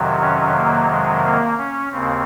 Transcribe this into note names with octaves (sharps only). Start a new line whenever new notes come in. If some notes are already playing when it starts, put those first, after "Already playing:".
Already playing: F2 C3 D#3 F#3
C#4
A#3
G#3
A#3
C#4
D#2 C#3 C4